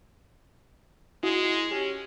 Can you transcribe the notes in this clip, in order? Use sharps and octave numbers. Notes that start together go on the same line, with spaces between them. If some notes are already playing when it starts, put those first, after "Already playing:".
G#3 E4 F#4 D#6
C#4 G4